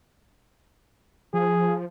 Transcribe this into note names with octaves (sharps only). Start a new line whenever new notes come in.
F3 G#4